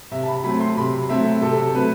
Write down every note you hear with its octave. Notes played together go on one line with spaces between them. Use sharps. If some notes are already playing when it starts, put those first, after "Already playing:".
C3 E5
A5
B5
F#3 A3 C4 B5
C6
C3 B5
F#3 A3 C4 E5
C3 A4
F#3 A3 C4 B4